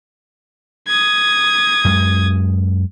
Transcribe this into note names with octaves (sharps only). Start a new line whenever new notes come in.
D#6 G#6
F#2 G#3